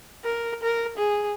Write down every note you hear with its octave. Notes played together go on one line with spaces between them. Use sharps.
A#4
A#4
G#4